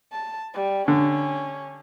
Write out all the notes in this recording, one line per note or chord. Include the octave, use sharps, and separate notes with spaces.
A5
G3
D3 C#4